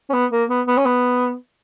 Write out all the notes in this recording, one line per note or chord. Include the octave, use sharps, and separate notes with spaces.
C#4
B3
A#3
B3
B3
C#4
B3